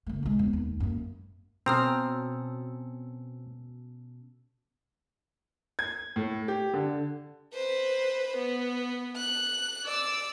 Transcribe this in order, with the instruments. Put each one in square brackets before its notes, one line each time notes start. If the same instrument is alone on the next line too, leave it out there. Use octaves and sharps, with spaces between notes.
[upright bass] F#1 A3
B1 G#3
F2 B3
D#2
F#2 A#3
[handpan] B2 C#4 A4 [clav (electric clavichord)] C4 [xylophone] A#5 D#6 F6
[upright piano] G#6
A2
G4
D3
[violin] B4 C5
B3
F#6
D5 E6